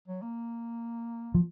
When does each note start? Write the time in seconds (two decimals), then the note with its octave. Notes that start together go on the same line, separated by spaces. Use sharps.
0.08 F#3
0.22 A#3
1.34 F3